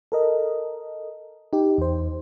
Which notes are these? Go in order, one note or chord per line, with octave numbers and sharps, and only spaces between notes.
A4 A#4 D#5
D#4 G4
E2 C5